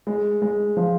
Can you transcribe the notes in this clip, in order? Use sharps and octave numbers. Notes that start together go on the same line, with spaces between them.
G#3
G#3
F3